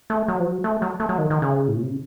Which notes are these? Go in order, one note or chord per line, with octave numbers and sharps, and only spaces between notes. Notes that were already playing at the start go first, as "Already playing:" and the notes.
A3
F#3
F3
F#3
A3
F#3
A3
F#3
D#3
D#3
C#3
A2
A#2
C3
C#3